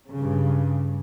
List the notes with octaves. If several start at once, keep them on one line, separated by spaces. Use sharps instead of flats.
G2 C#3